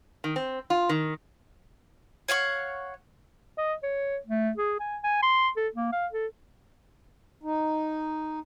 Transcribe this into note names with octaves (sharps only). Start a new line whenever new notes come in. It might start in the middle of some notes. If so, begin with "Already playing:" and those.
D#3
C4
F4
D#3
C#5 F5 F#5 C#6
D#5
C#5
A3
G#4
G#5
G#5
C6
A4
A#3
F5
A4
D#4